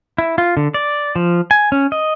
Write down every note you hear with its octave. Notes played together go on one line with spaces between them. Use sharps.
E4
F4
D3
D5
F3
G#5
C#4
D#5